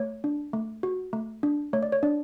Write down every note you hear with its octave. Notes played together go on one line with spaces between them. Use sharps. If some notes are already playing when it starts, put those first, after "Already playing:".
Already playing: A3 C#5
D4
A3
F#4
A3
D4
A3 C#5
D5
C#5
D4 D5